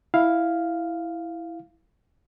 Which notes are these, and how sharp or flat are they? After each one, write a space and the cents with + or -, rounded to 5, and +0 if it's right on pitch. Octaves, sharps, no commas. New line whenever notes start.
E4 +0 F5 +0